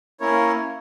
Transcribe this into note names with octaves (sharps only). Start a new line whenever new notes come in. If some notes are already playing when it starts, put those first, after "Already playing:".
A#3 C#4 E4 A#4 C#5